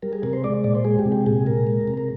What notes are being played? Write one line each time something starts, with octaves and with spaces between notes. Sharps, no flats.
G3 A#4
G#4
C3 A#4
C5
G#3 D5
A#2 D5
C5
G#3 G#4
G4
C3
G4
A#2 G#4
A#2 A#4
G#3
C3
A#4